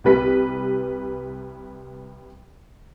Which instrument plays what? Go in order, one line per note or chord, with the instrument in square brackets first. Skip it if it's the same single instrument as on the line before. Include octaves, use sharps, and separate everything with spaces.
[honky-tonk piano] C2 G3 B4 B6